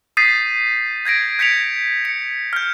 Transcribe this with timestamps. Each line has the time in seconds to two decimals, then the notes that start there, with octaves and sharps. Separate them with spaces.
0.17 D#6 G6 A6 B6 C7 D#7
1.05 G6 G#6 A#6 D7
1.39 G6 B6 C#7 D7 F7
2.05 C#7
2.53 F6 G6